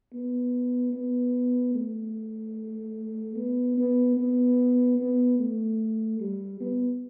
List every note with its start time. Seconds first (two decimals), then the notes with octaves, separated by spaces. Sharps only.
0.13 B3
0.93 B3
1.75 A3
3.36 B3
3.77 B3
4.17 B3
4.98 B3
5.39 A3
6.20 G3
6.60 B3